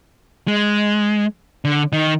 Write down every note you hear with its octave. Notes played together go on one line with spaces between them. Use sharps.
G#3
D3
D#3